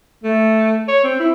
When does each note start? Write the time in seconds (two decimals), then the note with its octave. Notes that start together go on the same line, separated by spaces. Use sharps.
0.24 A3
0.88 C#5
1.04 C4
1.20 E4